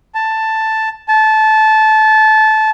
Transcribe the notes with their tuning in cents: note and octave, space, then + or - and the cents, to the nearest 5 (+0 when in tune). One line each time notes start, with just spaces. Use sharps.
A5 +5
A5 -20